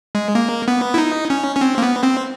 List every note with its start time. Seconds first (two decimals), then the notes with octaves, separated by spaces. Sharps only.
0.15 G#3
0.35 A#3
0.68 B3
0.94 E4
0.98 D#4
1.30 C#4
1.56 C#4
1.61 C4
1.78 A#3
1.82 B3
2.03 C4